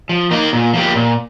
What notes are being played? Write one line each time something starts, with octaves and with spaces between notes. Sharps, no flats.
F3
A#3 D#4 A#4
A#2
F3 A#3 G4 A#4
A#2